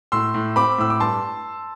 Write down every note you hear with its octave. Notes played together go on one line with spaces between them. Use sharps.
A2 C6 E6
A2
C4 B5 D6
A2 E6
D6
G2 A5 C6